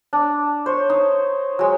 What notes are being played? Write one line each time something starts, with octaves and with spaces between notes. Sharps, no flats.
D4
C5 C#5
D#4
F#3 G#3